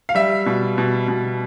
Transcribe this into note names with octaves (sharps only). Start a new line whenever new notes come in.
F5
G3 E5
B2
B2
B2